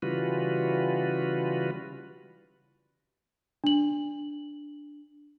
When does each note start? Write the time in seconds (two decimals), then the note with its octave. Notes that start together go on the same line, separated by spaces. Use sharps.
0.02 C#3 E3 G3 F4 F#4 B4
3.64 D4 F#7